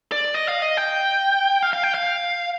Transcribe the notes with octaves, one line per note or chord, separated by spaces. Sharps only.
D5
D#5
F5
D#5
G5
F5
F5
G5
F5